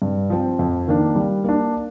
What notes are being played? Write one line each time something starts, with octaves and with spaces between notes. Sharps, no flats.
G2
F3 C4
F2
D#3 A#3 D4
G3
A#3 D4